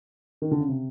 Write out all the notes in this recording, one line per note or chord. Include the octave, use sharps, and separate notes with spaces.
D#3
D3
C#3
C3